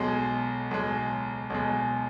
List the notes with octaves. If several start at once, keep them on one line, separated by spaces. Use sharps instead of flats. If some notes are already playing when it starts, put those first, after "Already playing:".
Already playing: B1 B2 G#3
B1 B2 G#3
B1 B2 G#3